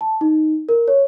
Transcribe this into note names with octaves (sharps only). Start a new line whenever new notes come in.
A5
D#4
A#4
C#5